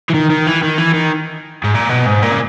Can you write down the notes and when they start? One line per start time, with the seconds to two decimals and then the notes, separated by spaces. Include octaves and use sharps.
0.09 E3
0.14 D#3
0.30 D#3
0.47 E3
0.63 D#3
0.78 E3
0.94 D#3
1.64 G#2
1.75 A#2
1.90 B2
2.06 G#2
2.23 A#2
2.31 C#3